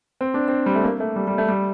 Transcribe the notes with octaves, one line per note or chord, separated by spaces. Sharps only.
C4
D4
C4
G3
A3
A#3
A3
G3
G3
A3
G3